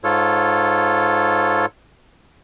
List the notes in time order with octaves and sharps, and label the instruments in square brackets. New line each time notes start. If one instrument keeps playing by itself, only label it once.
[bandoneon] G#2 F4 A4 C#5